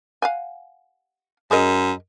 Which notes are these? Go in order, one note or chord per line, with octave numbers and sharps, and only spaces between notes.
F5 F#5 G#5
F#2 G#4 A#4 D#5